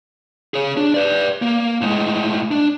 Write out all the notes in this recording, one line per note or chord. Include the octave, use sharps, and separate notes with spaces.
G#4 C#5
D4
B4 D5
A#3
A2 G#3
D4